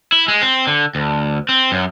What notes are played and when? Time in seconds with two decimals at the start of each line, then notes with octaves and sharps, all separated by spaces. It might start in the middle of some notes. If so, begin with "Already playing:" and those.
0.12 E4
0.28 G#3
0.41 C4
0.67 D3
0.95 D2
1.49 C4
1.72 F#2